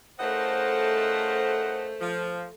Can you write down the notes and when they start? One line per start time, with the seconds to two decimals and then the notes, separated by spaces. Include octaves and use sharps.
0.20 C#3 A3 E4 A4 A#4 C5 D#5 F#5
2.01 F3